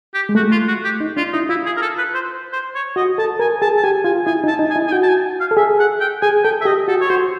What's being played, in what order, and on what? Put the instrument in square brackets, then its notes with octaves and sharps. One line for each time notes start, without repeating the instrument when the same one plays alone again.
[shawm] G4
[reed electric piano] G#3
[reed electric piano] A3 [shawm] F#4
[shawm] F4
F#4
G4
[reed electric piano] D#4
[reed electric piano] D4 [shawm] F4
[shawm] D#4 [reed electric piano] E4
[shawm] E4 [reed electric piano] F4
[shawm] G#4
A#4
A4
B4
C5
C5
C#5
[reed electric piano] F#4 [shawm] D#5
[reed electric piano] A4 [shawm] A5
[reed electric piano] A#4 [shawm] G#5
[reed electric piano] G#4 [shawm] A5
[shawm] A5
[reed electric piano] G4 [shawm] G#5
[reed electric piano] F4 [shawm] G#5
[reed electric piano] E4 [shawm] G#5
[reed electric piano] D#4
[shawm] A5
[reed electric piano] D#4
[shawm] G#5
[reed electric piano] E4
[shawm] G#5
[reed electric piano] F#4 [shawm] G5
[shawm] A5
G#5
F5
[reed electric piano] A4
[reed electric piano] G#4 [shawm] E5
[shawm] F#5
G5
[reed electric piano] G#4 [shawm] G#5
[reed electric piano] A4 [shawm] G5
[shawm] E5
[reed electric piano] G4 [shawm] D#5
[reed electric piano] F#4 [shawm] A4
[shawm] C#5
[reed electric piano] F#4 [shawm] C5